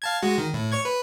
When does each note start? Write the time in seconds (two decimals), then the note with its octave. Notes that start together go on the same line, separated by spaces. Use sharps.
0.02 F5 A5 G#6
0.23 G#3 F#4
0.38 D#3
0.54 A2
0.72 C#5 C#6 G#6
0.85 B4